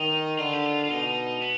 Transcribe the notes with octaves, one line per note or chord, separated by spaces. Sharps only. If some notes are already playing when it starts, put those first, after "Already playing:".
Already playing: D#3 D#4
D3 F4
G4
F4
F4
B2 D#4
B3